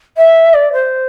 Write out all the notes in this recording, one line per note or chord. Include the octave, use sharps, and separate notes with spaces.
E5
D5
C5